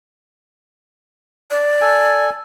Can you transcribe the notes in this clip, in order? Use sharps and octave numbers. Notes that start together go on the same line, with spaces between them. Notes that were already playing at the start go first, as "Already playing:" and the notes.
D5
A4 G#5